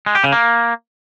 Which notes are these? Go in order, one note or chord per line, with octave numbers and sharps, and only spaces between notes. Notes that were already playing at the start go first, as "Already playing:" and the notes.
G#3
G4
C#3
A#3